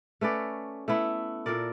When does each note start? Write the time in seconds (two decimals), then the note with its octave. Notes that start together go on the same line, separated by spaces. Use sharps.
0.21 A3 C#4 B4 D5
0.88 A3 B3 E4
1.46 A#2 A4 A#4 D5